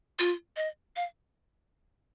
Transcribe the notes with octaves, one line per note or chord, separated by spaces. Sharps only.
F4
D#5
F5